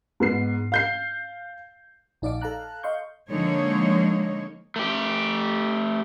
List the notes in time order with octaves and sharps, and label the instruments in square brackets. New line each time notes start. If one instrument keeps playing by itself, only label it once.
[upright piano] G#2 B3 C7
F5 G6 C7
[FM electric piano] A#1 D#4 D5 F5 D6
A4 F5 A5 A#5 F#6
D#5 F5 C6 C#6 G6
[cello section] D3 F3 G#3 A#3 D#4 C#5
[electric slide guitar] A3 G4